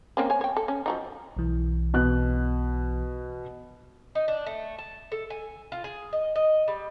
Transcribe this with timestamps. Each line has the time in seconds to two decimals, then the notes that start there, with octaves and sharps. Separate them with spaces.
0.17 A#3 C4 C#4
0.30 C#5 G#5
0.41 C#5 G5
0.57 A4
0.68 C#4
0.86 F3 F#3 D#4
1.37 B1 E3
1.94 B2 F#6
4.15 D#4
4.28 D4
4.47 A3
4.79 A5
5.12 A4
5.30 G#5
5.72 F4
5.84 G#4
6.13 D#5
6.36 D#5
6.68 G3